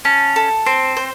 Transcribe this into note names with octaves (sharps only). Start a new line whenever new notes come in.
C#4 A5
A4
C4 C5
C5